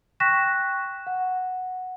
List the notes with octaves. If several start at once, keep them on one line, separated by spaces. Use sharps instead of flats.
G5 C#6 F#6 A#6 B6 E7
F#5